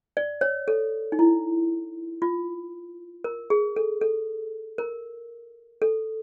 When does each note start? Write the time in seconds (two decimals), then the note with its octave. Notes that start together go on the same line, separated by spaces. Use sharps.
0.17 D5
0.41 C#5
0.68 A4
1.12 D#4
1.19 E4
2.22 F4
3.24 A#4
3.50 G#4
3.76 A4
4.01 A4
4.78 A#4
5.82 A4